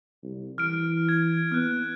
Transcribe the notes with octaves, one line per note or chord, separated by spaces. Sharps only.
C2
E3 F6 D7
G#6
B3 F6 F#6